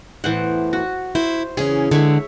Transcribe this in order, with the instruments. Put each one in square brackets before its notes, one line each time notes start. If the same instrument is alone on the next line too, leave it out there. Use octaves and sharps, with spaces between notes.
[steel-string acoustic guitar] E2 A2 [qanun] E3 C5 F#5
[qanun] F#4
[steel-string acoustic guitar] E4 [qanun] C5
[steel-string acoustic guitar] C#3 E3 C#4 [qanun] G#4
[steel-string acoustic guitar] D3 G#3 [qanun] C#5 E5